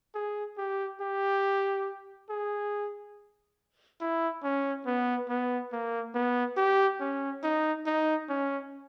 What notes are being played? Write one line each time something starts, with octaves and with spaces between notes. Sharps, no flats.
G#4
G4
G4
G#4
E4
C#4
B3
B3
A#3
B3
G4
C#4
D#4
D#4
C#4